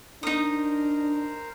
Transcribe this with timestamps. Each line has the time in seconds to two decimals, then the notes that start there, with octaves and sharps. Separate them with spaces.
0.23 D4 D#4 A#4 C5 D#6